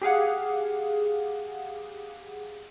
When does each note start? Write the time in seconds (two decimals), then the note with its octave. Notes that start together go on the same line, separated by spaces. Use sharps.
0.02 G4 G#4 F5 F#5